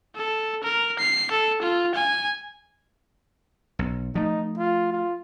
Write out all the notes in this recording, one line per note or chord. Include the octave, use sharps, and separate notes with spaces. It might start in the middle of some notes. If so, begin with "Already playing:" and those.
A4
A#4
C7
A4
F4
G#5
B1
F3 A3 D#4
F4
F4